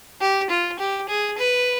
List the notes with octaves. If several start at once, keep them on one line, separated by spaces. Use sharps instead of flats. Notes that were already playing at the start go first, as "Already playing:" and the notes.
G4
F4
G4
G#4
B4